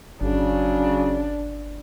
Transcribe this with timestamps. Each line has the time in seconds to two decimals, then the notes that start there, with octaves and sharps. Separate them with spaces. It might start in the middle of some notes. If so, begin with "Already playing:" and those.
0.21 G1 C#3 F#3 D4